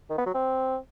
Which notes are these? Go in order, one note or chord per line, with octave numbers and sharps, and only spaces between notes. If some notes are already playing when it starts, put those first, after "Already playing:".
D#3
B3
F#3
C4